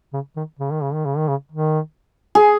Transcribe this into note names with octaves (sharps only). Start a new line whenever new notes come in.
C#3
D#3
C#3
D#3
C#3
D#3
C#3
D#3
C#3
D#3
G#4